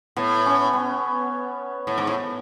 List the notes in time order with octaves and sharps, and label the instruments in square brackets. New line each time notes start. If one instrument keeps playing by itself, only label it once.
[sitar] A2 [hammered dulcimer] B3
[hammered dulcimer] C#4
B3
[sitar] A2
G#2
A2